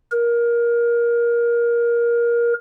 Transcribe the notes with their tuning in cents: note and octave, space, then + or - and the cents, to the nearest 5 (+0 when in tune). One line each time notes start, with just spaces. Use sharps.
A#4 +20